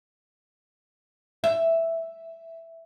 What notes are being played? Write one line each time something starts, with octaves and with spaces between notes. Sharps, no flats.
E5